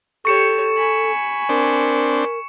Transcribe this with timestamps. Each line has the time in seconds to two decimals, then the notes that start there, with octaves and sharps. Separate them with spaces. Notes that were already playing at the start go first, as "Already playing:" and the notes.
0.25 G4 A4 C#5 C#6 C#7 E7
0.77 G#5 B5
1.49 C4 D4 A#4